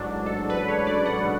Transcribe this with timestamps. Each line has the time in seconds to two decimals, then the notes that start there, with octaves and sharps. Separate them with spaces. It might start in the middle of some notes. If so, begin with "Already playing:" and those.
Already playing: A1 G#2 F#3 D4
0.26 A4
0.50 B4
0.68 C#5
0.87 D5
1.05 F#5
1.24 B2